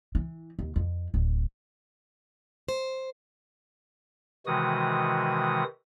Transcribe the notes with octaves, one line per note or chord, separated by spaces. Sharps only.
E3
D#2
F2
D1
C5
C3 D#3 E3 G#3 F#4 D#6